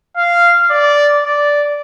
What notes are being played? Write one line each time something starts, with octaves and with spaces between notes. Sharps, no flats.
F5
D5
D5